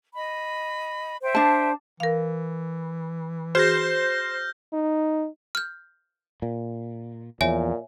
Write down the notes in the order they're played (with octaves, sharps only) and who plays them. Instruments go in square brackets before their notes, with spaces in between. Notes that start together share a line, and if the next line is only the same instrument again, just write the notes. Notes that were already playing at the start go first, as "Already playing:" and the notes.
[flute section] D#5 B5
C5 E5 G5
[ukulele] D4 A5
[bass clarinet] E3 [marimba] A#4 F5
[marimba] F#4 G#4 [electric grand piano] C5 [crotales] F6 G6 A#6
[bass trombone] D#4
[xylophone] F6 G6
[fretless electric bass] A#2
[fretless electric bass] E2 F3 [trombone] A#2 [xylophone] C#5 E5 G#5